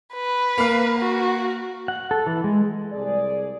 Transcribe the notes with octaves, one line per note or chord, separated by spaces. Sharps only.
B4
A#3 F5
F#4
F#5
A4
E3
G#3
C2 G#4 D5